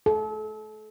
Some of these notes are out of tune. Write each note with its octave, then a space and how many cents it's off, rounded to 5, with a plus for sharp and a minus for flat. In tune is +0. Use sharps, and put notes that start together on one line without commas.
A4 -35